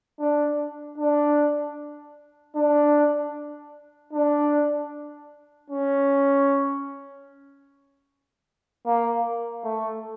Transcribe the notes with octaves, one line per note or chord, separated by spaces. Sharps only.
D4
D4
D4
D4
C#4
A#3
A3